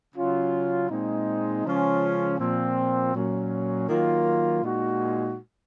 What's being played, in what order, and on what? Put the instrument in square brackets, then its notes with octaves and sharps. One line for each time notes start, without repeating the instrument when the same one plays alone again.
[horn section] C#3 F#3 C#4 F4
A#2 G#3 C4 D#4
C#3 F3 G#3 C#4 F4
A#2 F3 C4
A#2 F#3 C#4
D#3 F#3 A#3 F4
A#2 G#3 D#4 F#4